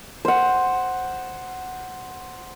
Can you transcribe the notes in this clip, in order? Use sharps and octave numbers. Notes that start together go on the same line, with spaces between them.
C5 F#5